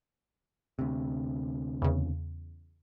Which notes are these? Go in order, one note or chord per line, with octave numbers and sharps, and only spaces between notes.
D2 C3
E2 C#3